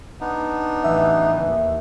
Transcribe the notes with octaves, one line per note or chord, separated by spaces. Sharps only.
B3 D4 D#4
A1 E3 E5
D#2